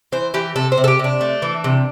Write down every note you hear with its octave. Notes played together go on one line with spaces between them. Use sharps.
E3 C5
E3 G4
C3 A4
C5
C3
A4
G4
C3 D4
A3
E3
C3